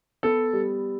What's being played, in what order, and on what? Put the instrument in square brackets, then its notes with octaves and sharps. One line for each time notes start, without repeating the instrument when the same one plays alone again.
[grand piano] B3 [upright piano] A4
[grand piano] G3